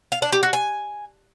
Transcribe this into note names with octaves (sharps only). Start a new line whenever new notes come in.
F5
D4
G4
F#4
G#5